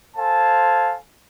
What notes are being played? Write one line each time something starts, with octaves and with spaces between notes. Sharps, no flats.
A4 C5 F5 G#5 A5